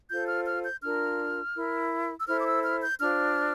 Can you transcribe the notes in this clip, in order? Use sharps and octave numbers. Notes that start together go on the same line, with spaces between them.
F4 A4 C5 G6
F6
F6
G6
D4 F4 A#4 F6
E4 A#4
E6
E4 A4 C5 F6
D6
E6
F6
G6
D4 F4 C5 F6